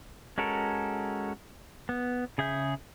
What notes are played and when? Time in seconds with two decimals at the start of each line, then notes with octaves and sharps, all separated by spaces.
0.38 G#3 C#4 F#4 A4 A#4
1.89 B3
2.38 C#3 G#4 E5 G6